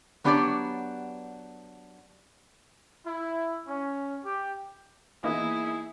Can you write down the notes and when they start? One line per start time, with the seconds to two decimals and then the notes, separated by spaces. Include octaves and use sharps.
0.24 F#3 B3 D4 G4 C#5 D5
3.05 E4
3.66 C#4
4.22 G4
5.24 E3 A#3 B3 D#4 E4 G#4